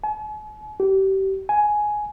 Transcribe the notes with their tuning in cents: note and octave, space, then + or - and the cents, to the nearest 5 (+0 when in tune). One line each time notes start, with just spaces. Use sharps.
G#5 +45
G4 -30
G#5 +10